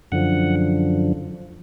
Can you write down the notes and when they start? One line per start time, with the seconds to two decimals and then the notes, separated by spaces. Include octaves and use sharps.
0.12 F#2 D3 F3 F#5